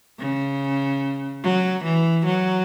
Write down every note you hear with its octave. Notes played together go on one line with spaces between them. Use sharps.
C#3
F#3
E3
F#3